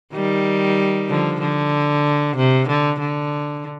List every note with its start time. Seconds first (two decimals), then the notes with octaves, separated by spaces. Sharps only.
0.14 D#3 G3
1.09 D3 F3
1.41 D3
2.37 C3
2.68 D3
3.00 D3